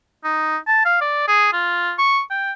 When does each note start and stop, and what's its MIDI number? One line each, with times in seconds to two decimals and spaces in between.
0.24 0.57 63
0.67 0.83 81
0.85 0.97 77
1.01 1.23 74
1.27 1.50 68
1.53 1.93 65
1.98 2.21 85
2.30 2.52 79